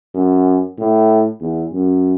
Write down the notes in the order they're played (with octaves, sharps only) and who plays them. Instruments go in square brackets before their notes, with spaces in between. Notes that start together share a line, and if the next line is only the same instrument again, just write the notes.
[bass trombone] F#2
A2
E2
F#2